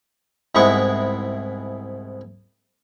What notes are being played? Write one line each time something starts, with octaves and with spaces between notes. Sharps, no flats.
C2 G#2 G#3 B3 E4 C#6